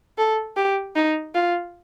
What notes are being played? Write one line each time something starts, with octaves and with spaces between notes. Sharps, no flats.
A4
G4
D#4
F4